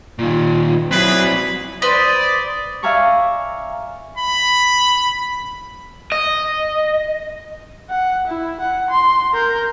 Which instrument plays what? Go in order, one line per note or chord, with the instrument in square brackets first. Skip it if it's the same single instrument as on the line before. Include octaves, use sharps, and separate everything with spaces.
[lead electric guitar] A#2 D#3 [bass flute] F4
[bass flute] F#3 [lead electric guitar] C4 E4 [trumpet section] G#4 B4
[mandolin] B4 C5 [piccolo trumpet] D5 [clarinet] D#6
[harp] D5 E5 F5 G#5 A#5 C#6
[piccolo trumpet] B5
[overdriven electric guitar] D#5
[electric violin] F#5
E4
F#5
C6
A#4 G6